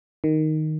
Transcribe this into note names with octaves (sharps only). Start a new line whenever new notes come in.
D#3